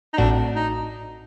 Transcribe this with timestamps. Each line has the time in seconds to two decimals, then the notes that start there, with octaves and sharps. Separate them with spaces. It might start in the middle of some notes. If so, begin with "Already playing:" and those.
0.14 D#4
0.17 A1 A2 A3 C4 D4 F#4
0.56 D#4